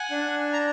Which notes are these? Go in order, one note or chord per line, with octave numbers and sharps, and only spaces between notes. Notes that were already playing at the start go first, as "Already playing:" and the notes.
Already playing: F#5 G#5
D4
A#5